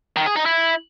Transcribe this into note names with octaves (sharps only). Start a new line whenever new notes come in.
D#3
G#4
D#4
E4